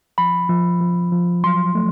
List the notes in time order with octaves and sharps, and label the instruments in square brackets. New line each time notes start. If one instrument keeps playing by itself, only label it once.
[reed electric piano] F3 B5
F3
F3
F3
F#3 C6
A3